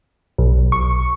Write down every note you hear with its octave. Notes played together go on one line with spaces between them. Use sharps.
B1
C#6